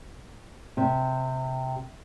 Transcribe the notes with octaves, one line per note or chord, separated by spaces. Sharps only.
C3